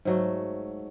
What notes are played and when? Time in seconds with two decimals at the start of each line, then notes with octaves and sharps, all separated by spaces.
0.05 G#2 F#3 A3